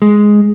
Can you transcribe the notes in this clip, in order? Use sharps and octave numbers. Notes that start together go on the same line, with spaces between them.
G#3